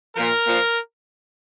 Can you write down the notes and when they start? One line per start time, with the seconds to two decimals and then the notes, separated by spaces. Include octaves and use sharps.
0.16 A#2 F3 A#4
0.46 A#2 F3